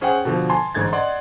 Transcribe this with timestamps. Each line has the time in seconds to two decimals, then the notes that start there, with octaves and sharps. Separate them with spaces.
0.01 C#4 G#4 C5 F#5 G5
0.25 B2 D3 F3
0.50 G#5 A5 C6
0.74 A1 G#2 D3 G#6 A6
0.93 D5 D#5 F#5 C6